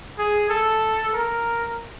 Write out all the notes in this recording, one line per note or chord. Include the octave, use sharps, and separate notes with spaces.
G#4
A4
A#4